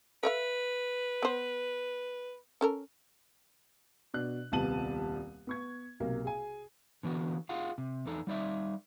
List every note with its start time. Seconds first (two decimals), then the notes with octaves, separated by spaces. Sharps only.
0.23 A4 B4 E5 F5
1.23 B3 C5
2.61 C#4 A4 A#4
4.14 B2 D4 F#6
4.52 D#1 C2 B3 A5 D#7 F#7
5.47 B3 C#6 G#6
6.00 B1 C3 A#3
6.24 G#4 G#5
7.03 D3 E3 B3 F#4
7.49 F4 G#4 F5 F#5
7.78 C3
8.06 E2 D#4 A4
8.27 G3 D#4 D5 E5